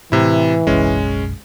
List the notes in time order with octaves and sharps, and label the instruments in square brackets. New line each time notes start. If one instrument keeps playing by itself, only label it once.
[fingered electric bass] A2 [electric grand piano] C3 E4 [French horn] E3
[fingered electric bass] F#1 B1 [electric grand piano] G#3 C#4